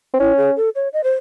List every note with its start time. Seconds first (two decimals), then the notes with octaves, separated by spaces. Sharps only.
0.14 C4
0.19 C#4 E4
0.38 G#4
0.56 A4
0.75 C#5
0.93 D#5
1.04 C5